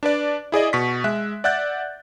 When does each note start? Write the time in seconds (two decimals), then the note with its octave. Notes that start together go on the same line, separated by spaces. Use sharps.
0.03 D4 B4 D5
0.52 E4 G#4 D5 D#5
0.73 B2 C#6 B6
1.04 G#3 E5 F#6
1.44 D5 E5 F#5 F#6 G6 A6